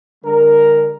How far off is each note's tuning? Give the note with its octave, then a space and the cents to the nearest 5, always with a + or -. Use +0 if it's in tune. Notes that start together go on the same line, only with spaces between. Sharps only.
D3 +0 G3 +45 A#4 +0